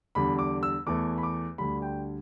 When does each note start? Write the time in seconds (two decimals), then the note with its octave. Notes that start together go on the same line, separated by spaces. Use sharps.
0.15 E2 D3 G3 B5
0.39 D6
0.63 E6
0.86 E2 E3 A3 D6
1.18 B5
1.23 D6
1.58 D2 D3 G3 B5
1.82 G5